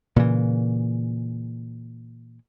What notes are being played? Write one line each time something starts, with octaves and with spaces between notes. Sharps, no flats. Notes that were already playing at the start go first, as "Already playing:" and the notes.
A#2 C#3 E3